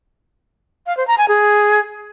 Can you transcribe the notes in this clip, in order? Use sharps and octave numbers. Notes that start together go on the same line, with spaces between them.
F5
C5
A#5
G#5
G#4